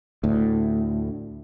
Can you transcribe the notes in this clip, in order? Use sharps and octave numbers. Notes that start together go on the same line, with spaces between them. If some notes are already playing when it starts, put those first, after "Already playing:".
D2 A2